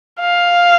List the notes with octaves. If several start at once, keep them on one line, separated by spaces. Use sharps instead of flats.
F5